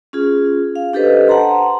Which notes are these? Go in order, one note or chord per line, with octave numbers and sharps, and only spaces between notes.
C#4 F4 G#4
F5
D4 G4 A4 B4 C5 D#5
F#5 A5 A#5 C6